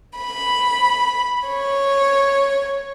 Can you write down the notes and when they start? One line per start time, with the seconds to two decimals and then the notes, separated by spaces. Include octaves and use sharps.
0.18 B5
1.48 C#5